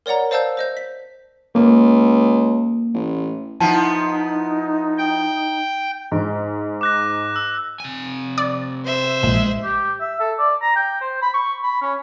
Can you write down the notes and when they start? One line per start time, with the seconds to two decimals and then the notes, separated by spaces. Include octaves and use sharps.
0.06 A#4 C#5 D5 F#5 A#5
0.31 C5 D5 F5 A5 E6 G6
0.57 C5 D#5 G6
0.77 B6
1.55 C#2 A#3
2.94 A1
3.60 F3 B3 D#4 E4 A5
4.98 G5
6.12 G#2
6.81 D6 F#6 A#6
7.36 E6
7.80 C3 G#5
8.38 D5
8.86 C5 E5
9.23 A#1 G#3
9.64 G4
10.00 E5
10.20 A4
10.39 D5
10.62 A#5
10.76 G5
11.01 C5
11.22 B5
11.34 C#6
11.63 B5
11.82 C#4